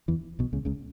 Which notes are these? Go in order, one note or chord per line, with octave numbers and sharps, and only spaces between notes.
E2 E3
B1 B2
C#2 C#3
C#2 C#3